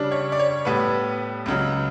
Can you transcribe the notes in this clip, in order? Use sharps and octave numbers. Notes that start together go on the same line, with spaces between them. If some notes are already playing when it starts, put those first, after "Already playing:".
Already playing: C#3 G3 D4
C#5
D5
C#5
A2 G3 B3 B4
C#2 C#3 F#3